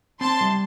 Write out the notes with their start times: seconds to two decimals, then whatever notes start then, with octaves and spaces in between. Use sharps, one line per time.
0.20 C4 A5 C6
0.41 G3